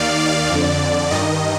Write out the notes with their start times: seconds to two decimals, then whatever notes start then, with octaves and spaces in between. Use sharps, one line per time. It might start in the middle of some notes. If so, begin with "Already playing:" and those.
Already playing: D#2 D#3 D5 F5
0.20 D5
0.50 F2 D3
1.11 G2 D#3 D#5